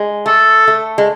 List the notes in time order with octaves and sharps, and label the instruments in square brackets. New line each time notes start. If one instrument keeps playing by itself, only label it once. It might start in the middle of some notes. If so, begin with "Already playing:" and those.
Already playing: [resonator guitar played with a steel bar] G#3
[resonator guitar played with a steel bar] A3 [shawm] A4
[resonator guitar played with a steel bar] A3
G#3